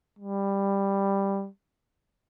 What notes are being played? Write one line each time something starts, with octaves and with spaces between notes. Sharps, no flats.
G3